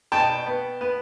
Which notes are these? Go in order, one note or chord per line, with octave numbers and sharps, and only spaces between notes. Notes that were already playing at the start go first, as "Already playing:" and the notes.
B2 G5 A5
B3
B3